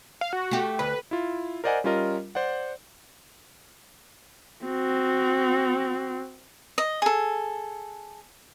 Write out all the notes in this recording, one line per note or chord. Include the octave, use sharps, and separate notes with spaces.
F5
F#4
A3 G4
D2 B4
E4 F4
A#4 C5 D5 D#5 F#5 G#5
G3 C#4 F4 A#4 D#5
C5 D5 F#5
C4 F#4
D#5
G#4 A4